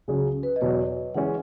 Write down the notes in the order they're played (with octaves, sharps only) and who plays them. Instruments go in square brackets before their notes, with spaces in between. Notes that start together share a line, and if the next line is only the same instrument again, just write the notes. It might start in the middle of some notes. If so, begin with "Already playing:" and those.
[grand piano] C#2 C#3 F#3 C#4 G#4
[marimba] B4
D#5
[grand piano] E2 B2 F#3 [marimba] C#5
[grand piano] E3 G#3 C#4 E4 [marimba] F#5